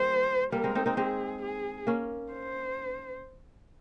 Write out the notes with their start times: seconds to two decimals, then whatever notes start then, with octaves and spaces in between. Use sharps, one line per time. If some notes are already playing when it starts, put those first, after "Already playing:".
Already playing: G3 A#3 C5
0.52 G3 A#3 A#4
0.64 G#3 C4
0.75 C4 D#4
0.86 C4 D#4
0.97 G#3 C4 G#4
1.42 G#4
1.87 A#3 C#4
2.32 C5